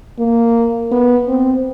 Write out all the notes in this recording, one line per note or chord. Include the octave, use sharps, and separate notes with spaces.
A#3
B3
C4